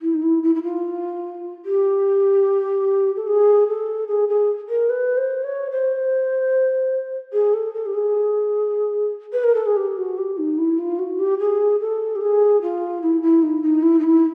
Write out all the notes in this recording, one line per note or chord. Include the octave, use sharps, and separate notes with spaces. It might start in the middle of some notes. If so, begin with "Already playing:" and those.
E4
D#4
E4
E4
E4
F4
G4
A4
G#4
A4
G#4
G#4
A#4
B4
C5
C#5
C5
G#4
A4
A4
G4
G#4
B4
A#4
A4
G#4
G4
F#4
G4
D#4
E4
F4
F#4
G4
G#4
A4
G4
G#4
F4
E4
E4
D#4
D#4
E4
D#4
E4